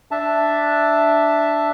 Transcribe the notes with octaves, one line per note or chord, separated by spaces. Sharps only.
D4 E5 A5